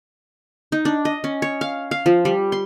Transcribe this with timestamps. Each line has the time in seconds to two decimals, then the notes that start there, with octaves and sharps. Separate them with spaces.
0.72 D#4
0.85 D4
1.05 D#5
1.24 C#4
1.42 C#5
1.61 F5
1.91 F5
2.06 F3
2.25 G3
2.52 C6